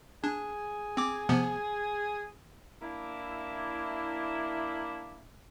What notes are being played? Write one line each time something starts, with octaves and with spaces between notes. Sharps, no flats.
D4 G#4
C4 D6
C3 F3 B3
A#3 D4 E4